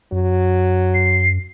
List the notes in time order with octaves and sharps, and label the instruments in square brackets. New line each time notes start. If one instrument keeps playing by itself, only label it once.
[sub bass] F#2 [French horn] F#3
[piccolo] C7